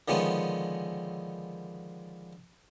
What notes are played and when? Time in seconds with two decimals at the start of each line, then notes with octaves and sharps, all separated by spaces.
0.08 D3 D#3 F3 G#3 B3 C#4